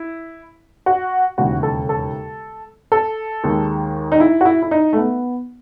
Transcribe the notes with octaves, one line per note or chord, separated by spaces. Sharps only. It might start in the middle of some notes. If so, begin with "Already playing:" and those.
Already playing: E4
F#4
E1 D#2 C#3 E3 F#4
A4
A4
A4
D#2 D#3 G#3
D#4
E4
F#4
E4
E4
D#4
A3
B3